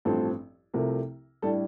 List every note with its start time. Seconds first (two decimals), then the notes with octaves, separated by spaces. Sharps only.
0.05 A1 G2 F3 C4 A4
0.74 C2 C3 F3 A3 A#4
1.42 A2 G3 D4 A4